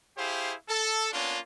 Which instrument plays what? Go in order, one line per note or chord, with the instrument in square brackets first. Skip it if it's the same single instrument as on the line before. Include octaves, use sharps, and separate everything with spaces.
[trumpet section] E4 G4 G#4 C5 F5
A4
A#3 B3 C#4 D4 F4